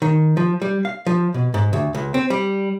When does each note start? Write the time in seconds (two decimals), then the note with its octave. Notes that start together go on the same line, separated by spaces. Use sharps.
0.02 D#3
0.37 F3
0.62 G3
0.85 F5
1.07 F3
1.34 B2
1.54 G#2
1.73 D2
1.95 C#2
2.14 C4
2.30 G3